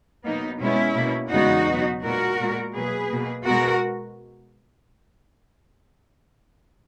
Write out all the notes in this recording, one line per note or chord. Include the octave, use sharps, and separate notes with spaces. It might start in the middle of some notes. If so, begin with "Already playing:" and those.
B2 F#3 A#3 B3 D#4
B2 G#3 B3 C#4 E4
B2 A#3
E2 C#3 G#3 B3 D#4 F#4
B2 F#3 B3
A#2 G#3 B3 F#4 A#4
A#2 G#3 B3
B2 F#3 A#3 G#4 B4
B2 A#3
B2 G#3 B3 F#4 A#4